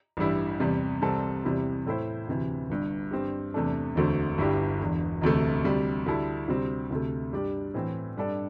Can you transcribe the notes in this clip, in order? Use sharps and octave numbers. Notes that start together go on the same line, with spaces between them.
A1 G2 G3 E4
E2 C3 G3
C2 C3 G3 C4 A4
E2 C3 G3 E4
A2 A3 E4 C5
D2 C3 E3
G1 G2 G3
G2 D3 C4 G4
E2 C3 A3 D4 A4
E1 D2 D3 A3 C4
G1 G2 G3 E4 G4
E1 E2 D3
E1 D2 C3 A3
D2 C3 G3
D2 D3 G3 E4 A4
D2 C3 G3 C4
D2 C3 A3
G2 G3 D4 G4 D5
A2 E3 C4
G2 G3 D4 A4 D5